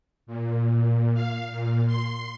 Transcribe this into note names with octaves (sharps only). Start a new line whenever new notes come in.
A#2
A#2
F5
A#2
C6